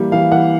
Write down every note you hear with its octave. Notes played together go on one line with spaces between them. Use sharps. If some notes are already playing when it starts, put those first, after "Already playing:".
Already playing: E3 G3 A#3
E3 F5
E3 F#5